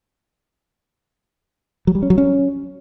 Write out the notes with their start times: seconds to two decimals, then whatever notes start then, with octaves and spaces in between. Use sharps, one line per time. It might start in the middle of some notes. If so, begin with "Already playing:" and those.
1.87 F#3
1.95 G3
2.03 C#4
2.10 F#3
2.18 C#4